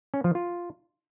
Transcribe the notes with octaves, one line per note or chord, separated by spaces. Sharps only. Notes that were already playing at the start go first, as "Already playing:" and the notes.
C#4
F3
F4